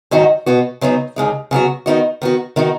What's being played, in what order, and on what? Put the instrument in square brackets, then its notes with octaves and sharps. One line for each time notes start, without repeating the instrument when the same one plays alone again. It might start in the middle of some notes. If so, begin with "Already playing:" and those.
[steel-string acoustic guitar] G#2 D#3 F#3 D#4 F#4
B2 B3 F#4
C#3 F#3 B3 D#4
D#2 C#3 G#3 D#4
C#3 F#3 B3 F#4
D#3 B3 D#4 F#4
D#3 B3 F#4
D#3 B3 D#4 F#4